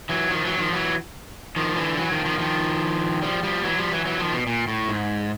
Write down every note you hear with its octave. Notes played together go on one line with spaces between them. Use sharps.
E3 F#3
D#3 F3
E3 F#3
D#3 F3
E3 F#3
D#3 F3
D3 E3
E3 F#3
D#3 F3
D#3 F3
D#3 F3
F3 G3
F3 G3
E3 F#3
F3 G3
E3 F#3
E3 F#3
D#3 F3
B2
A#2
A2
G#2